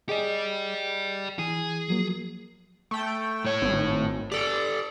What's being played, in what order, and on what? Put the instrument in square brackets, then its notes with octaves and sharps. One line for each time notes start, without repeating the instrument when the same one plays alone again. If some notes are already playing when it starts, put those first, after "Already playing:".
[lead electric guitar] G4 D5 [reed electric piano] G#4 D#5
[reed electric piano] E3 [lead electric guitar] G#4
[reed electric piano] F3 F#3 A#3
[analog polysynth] A3 G5
[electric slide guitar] A2 C#5
[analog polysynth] G#1
[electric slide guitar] G4 A4 [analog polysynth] D5